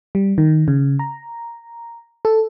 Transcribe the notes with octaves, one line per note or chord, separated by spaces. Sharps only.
G3
D#3
C#3
A#5
A4